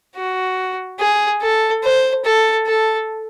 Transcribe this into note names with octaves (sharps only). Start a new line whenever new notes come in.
F#4
G#4
A4
C5
A4
A4